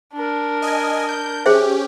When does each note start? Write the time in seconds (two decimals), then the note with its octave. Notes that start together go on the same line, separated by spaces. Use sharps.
0.14 D4 A#4
0.62 D#5 G#5
1.09 G6
1.46 C#4 G4 G#4 C5 E5